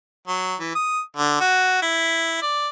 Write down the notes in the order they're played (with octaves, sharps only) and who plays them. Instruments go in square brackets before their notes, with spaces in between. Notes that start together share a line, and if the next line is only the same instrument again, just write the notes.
[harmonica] F#3
E3
D#6
D3
F#4
E4
D5